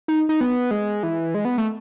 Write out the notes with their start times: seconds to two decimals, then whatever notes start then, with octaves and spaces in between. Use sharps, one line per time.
0.08 D#4
0.29 D#4
0.41 B3
0.71 G#3
1.03 E3
1.34 G#3
1.45 B3
1.58 A3